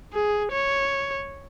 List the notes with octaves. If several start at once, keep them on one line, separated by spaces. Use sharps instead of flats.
G#4
C#5